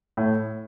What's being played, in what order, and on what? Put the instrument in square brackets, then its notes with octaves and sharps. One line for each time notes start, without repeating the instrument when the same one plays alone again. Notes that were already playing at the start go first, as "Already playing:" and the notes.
[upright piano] A2